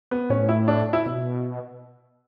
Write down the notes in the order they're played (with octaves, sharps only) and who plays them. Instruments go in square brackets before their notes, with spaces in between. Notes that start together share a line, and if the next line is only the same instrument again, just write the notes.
[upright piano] B3
[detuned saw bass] A2 [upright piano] C#4
[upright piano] E4
D4
E4
[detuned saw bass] B2